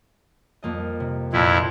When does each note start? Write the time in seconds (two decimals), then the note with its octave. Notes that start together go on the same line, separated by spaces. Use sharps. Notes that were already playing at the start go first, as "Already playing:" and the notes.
0.63 F2 A#3 D#5
1.00 C3
1.33 A#1 F2 E4